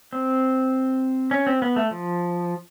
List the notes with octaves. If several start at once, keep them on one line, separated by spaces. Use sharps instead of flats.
C4
C#4
C4
B3
A3
F3